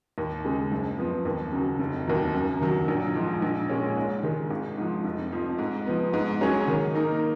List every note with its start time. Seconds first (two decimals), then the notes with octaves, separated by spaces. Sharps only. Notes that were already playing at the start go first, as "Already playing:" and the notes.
0.18 D#2
0.45 C#3 G#3
0.72 F#1
0.98 F2 F3 B3
1.25 D#2
1.52 C#3 F#3
1.79 F1
2.07 D#2 D#3 F#3
2.33 F#2
2.61 D#3 F#3
2.88 A#1
3.15 G#2 F3
3.42 A#1
3.69 A#2 G#3 C#4
3.96 G#2
4.23 D#3 G#3
4.50 G#1
4.78 G#2 F3
5.05 F1
5.32 F2 F3
5.58 G#2
5.86 F3 B3
6.13 G#2
6.41 F#3 C#4 G#4 C#5
6.67 D#3
6.95 A#3 D#4 A#4